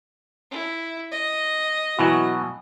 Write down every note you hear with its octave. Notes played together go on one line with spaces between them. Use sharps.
E4
D#5
B2 E3 F#3 F#4